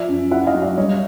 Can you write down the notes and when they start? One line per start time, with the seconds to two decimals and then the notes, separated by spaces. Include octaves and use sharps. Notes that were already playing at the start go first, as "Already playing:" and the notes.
Already playing: F3 D5 E5
0.09 F#2
0.31 E4 E5 F#5
0.47 D#5 F5
0.54 F#3
0.62 D5 E5
0.77 G3 C#5 D#5